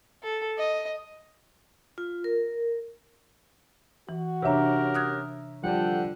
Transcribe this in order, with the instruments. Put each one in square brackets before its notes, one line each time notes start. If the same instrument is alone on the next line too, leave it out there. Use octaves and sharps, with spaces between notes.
[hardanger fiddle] A4
D#5
[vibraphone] F4
A#4
[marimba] E3 [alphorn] F#4
[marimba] C3 D4 [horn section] C#4 G4 A#4 [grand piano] C#5 E5 A#5
[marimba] D#6 F#6 G#6
[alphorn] D3 [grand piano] F3 G3 [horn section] A4 F#5 G5